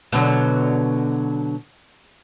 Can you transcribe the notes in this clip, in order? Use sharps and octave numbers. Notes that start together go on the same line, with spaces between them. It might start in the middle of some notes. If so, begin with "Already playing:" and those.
B2 D3 F#3